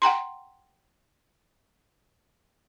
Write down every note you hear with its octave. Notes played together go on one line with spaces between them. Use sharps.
F#5 G5 A#5 C6